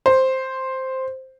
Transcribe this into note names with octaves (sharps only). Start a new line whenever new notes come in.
C5